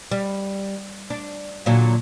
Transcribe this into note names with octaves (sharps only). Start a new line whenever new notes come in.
G3
D4
A#2 D3 F#3